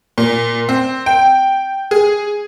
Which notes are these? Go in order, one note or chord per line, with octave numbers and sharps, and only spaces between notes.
A#2
C4
G5
G#4